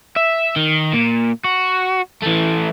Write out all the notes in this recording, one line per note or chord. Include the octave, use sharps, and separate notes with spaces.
E5
D#3
A#2
F#4
E3 A3